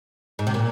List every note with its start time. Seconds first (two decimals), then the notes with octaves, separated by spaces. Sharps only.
0.39 G#2
0.47 C3
0.54 A#2